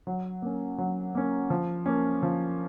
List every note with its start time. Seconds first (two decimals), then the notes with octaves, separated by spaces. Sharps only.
0.07 F#3
0.42 A#3 C#4
0.78 F#3
1.15 A#3 C#4
1.50 F3
1.86 A#3 C#4
2.23 F3